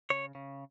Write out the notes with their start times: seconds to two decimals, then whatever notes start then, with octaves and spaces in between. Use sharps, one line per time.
0.10 C#3 C#5
0.35 C#3